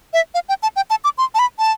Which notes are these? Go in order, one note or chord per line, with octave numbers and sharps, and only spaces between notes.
E5
F5
G5
A5
G5
A5
D6
C6
A5
B5
A5